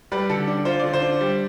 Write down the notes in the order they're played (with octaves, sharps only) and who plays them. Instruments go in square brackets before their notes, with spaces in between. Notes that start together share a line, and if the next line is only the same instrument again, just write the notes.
[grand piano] G3 B4
D3 A4
D4
F4 C5
D3 D5
C5
D4
G3